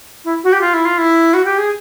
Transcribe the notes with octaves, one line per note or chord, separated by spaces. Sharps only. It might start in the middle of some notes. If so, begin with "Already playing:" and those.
E4
F#4
G4
F4
E4
F4
E4
F#4
G4
G#4